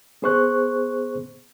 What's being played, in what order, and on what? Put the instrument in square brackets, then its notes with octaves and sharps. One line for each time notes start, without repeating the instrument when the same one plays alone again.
[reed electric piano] B3 G#4 C5 C#6 F#6